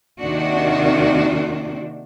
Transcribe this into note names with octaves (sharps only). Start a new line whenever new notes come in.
D#2 C3 D#3 C4 D4 F#4